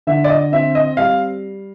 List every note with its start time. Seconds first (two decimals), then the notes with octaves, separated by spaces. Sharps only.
0.07 D3 E5
0.24 D5
0.30 D#5
0.52 C4 E5
0.75 D#5
0.97 G3 F5